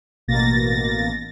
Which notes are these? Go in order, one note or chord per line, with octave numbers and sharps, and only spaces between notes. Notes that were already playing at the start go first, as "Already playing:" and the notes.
A1 B2 A#3 A6 A#6